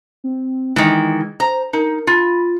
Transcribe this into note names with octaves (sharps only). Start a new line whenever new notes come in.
C4
D#3 E3 G#3
C5 A#5
D#4 A#4
F4 B5